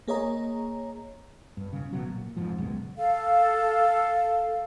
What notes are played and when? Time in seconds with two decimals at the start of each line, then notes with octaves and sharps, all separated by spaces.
0.08 A#3 G#4 C#5 D#5 A#5
1.57 G2
1.73 E1 C#3
1.93 A1 B2 F#3
2.09 A#2
2.37 F1 F2 G#2 F3
2.58 C#2 F#2 B2 G#3
2.97 A4 F5